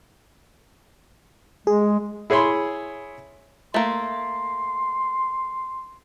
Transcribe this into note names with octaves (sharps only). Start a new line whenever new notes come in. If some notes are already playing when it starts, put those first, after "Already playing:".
G#3 G#4
E4 G#4 C#5 B5 C6
A3 A#3 C6